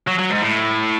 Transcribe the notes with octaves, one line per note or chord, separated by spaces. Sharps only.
F#3
F#3
G#2
A2